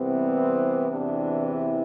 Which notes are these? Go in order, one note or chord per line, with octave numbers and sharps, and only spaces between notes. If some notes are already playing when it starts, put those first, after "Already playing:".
Already playing: C2 C3 E3 B3 C4
E2 C3 E3 D4
E4